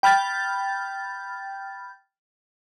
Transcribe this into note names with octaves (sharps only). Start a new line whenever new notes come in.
G5 B5 F6 G6 A6